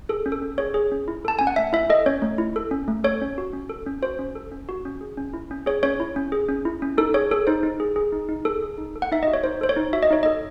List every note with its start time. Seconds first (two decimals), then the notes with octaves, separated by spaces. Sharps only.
0.09 G#4 A4
0.26 C#4
0.32 A4
0.42 C#4
0.58 G#4 C#5
0.74 G#4
0.92 C#4
1.08 E4
1.25 A4 A5
1.39 C#4 G#5
1.47 F#5
1.56 A3 E5
1.73 E4 E5
1.90 A4 D#5
2.06 C#4 C#5
2.22 A3
2.38 E4
2.56 A4
2.71 C#4
2.88 A3
3.04 A4 C#5
3.22 C#4
3.38 F#4
3.53 C#4
3.70 A4
3.86 C#4
4.03 F#4 C5
4.19 C#4
4.35 A4
4.52 C#4
4.69 F#4
4.85 C#4
5.01 G#4
5.17 C#4
5.34 E4
5.51 C#4
5.66 G#4 C#5
5.83 C#4 C#5
6.00 E4
6.16 C#4
6.32 G#4
6.49 C#4
6.65 E4
6.82 C#4
6.98 D#4 A4
7.14 G#4 C#5
7.31 G#4 A4
7.47 D#4 C5
7.63 D#4
7.80 G#4
7.96 G#4
8.12 D#4
8.29 D#4
8.45 G#4 A4
8.62 G#4
8.78 D#4
8.96 A4
9.02 F#5
9.12 D#4 E5
9.23 F#4 D#5
9.33 C#5
9.44 D#4 C5
9.61 A4 C5
9.69 C#5
9.76 D#4
9.93 F#4 E5
10.03 D#5
10.10 D#4 C#5
10.23 A4 D#5